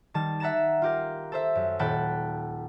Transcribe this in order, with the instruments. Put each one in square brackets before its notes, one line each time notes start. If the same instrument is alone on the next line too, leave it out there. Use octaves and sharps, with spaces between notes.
[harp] D#3 G3 A5
E5 F#5 A#5 A6 E7
F4 G4 A#4
A4 C5 E5
F#2
D#1 F#5 G5 A5 B5 F#6